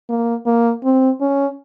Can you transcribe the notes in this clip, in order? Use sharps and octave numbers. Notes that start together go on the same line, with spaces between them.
A#3
A#3
C4
C#4